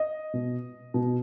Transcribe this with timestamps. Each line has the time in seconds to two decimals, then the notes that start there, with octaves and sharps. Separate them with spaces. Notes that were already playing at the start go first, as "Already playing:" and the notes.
Already playing: D#5
0.33 B2
0.94 B2